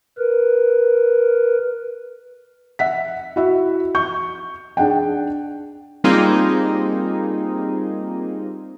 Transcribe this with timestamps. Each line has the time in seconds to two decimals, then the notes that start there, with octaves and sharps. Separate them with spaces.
0.18 A#4 B4
2.79 E5 F#5 B6
3.36 E4 F#4 E5
3.95 C#6 G6
4.77 D4 G#4 F#5 G5
6.04 G3 A#3 C4 D#4 F4 G#4